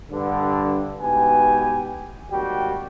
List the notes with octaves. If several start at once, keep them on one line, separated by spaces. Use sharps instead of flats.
G2 D3
G#2 B2 G4 B4 G#5
G#1 D#2 G3 F#4 G4 G5